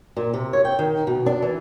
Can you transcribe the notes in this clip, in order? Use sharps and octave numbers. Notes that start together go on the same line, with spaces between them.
A#2
C3
C#5
G5
D#3
B2
D4
E3